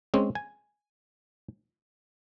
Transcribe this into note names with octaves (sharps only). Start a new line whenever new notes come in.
G#3 C4 C#4
G#5